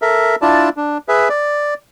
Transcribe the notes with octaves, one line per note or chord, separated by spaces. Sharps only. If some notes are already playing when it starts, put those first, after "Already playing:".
A4 A#4 E5
D4 E4 F4 D5 A5
D4
G#4 B4 E5
D5